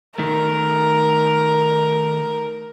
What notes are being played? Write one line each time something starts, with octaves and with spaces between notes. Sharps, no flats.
D#3 A3 A#4